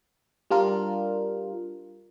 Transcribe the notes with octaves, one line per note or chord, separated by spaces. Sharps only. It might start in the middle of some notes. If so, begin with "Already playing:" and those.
G3 D4 F4 A#4